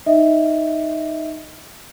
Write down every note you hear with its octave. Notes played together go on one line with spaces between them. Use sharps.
D#4 D#5 E5